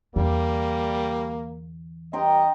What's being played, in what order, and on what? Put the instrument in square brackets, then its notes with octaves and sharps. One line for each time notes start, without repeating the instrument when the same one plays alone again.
[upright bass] E2 D3 [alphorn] G3 [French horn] A#3
[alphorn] G2 [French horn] D#5 [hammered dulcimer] G5 A#5 C6